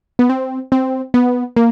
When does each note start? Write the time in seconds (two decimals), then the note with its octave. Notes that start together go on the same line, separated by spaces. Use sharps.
0.19 B3
0.29 C4
0.72 C4
1.14 B3
1.56 A#3